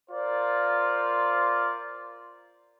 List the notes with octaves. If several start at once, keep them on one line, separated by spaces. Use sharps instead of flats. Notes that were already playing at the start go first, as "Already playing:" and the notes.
F4 A#4 C5 D5